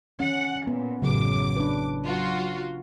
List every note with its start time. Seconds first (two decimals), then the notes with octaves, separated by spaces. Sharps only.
0.20 C#4 F#5
0.67 A#2 B3
1.02 A1 F#2 C#3 F#3 D6
1.57 D4 B4
2.04 F#3 F4 F#4